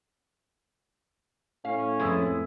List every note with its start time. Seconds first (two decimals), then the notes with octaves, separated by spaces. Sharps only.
1.65 A2 C#4 F5
2.00 F2 G#3 B3 E4